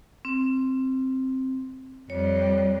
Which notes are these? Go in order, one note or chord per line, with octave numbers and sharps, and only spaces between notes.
C4
F2 G3 C#5